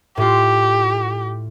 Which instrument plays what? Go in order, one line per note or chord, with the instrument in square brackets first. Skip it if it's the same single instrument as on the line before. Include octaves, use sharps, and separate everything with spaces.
[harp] A2 F4 [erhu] G4